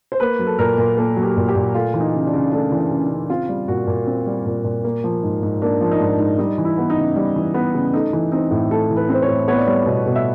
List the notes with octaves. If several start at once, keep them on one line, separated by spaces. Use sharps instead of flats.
C5
A#3 B4
F#3
A4
A#2 A#4
A#2
A#3 A4
F#3
G4
A#2
G4
A#2
A3 F4
E3
D#4
C#3
D4
C#3
A3 D4
E3
D4
C#3
D#4
C#3
C4 F4
G3
A#2 F#4
A#2
C4
G3
A#2
A#2
A#3
F3
G#2
G#2
A#3 D4
F3
D#4
G#2 D4
G#2
G3 D#4
E3
E4
B3
D#4
C#3
G3
E3
B3
C#3
A3 D#4
E3
C4 D#4
A2
A3 A4
E3
B4
C4 C5
C#5
A2
B3 C#5
D5
G3 C#5
B2
B2
E5